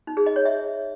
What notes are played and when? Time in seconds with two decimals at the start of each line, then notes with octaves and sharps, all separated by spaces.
0.07 D#4
0.17 G#4
0.26 D#5
0.36 C#5
0.46 E5